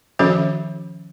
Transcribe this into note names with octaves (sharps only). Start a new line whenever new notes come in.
D#3 F3 C#4 F#4 A4 E5